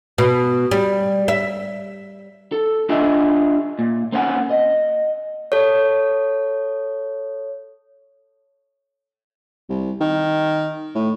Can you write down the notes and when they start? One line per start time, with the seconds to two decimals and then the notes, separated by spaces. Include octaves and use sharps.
0.18 B2
0.71 G3
1.28 E5
2.52 A4
2.89 D4 F4 G4 G#4 D#5 E5
3.79 A#2
4.12 A#3 C4 C#4 E4 F#5 G#5
4.50 D#5
5.52 A4 C#5
9.69 C2
10.01 D#3
10.95 A2